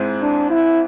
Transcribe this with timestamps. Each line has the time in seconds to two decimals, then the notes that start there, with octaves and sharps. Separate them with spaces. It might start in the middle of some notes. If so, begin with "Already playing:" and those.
Already playing: G#2 G#3 C4 E4
0.22 D4
0.50 E4